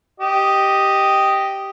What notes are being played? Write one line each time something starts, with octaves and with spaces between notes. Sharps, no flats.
G4 D#5